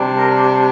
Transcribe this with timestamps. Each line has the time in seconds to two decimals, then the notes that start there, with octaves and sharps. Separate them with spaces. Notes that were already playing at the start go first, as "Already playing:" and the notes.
Already playing: C3 G3 D4
0.16 A#4